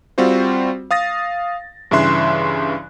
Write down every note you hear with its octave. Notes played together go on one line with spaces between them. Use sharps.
G3 C4 F4 F#4 C5
F5 D#6 A6 A#6
G2 C#3 E3 E5 C6 F#6